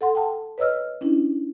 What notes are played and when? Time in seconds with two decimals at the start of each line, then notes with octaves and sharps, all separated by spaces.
0.01 A4 F#5 C6
0.15 G5 A5
0.58 B4 C#5 D#5 E6 F6
1.01 C#4 D4 E4